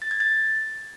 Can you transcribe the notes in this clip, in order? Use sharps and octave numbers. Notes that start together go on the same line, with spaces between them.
A6
G#6
A6